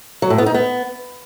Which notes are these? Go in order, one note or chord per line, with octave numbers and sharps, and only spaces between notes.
F#3
A2
B3
D#4
B3